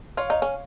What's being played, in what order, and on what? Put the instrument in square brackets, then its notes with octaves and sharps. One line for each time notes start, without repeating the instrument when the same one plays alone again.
[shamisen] F4 [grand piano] C#5 F5
[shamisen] D#4
C#4